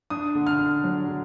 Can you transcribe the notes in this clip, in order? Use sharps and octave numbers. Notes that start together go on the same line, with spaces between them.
D4 D#6
D3
F6
D4
F#3
D3